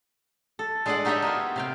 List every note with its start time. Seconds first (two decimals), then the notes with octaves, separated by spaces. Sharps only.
0.59 A4
0.86 G#3 D4 G#4 A4 D5 F#5
1.05 D#4 F#4 G4 C#5 D#5 E5
1.22 A#3 B3 F4
1.56 C3 F5 G5